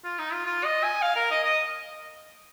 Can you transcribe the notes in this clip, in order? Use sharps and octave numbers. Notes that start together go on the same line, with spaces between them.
F4
D#4
F4
F4
D#5
G#5
F5
A#4
D#5
D#5